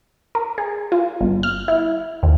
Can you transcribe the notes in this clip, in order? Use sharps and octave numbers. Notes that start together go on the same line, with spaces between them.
A#4
G#4
F4
G1
F6
E4
D#2